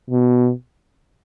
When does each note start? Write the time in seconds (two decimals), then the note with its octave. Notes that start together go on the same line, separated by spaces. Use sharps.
0.10 B2